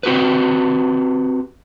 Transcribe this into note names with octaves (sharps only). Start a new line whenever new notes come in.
C4 F#4 G4 B4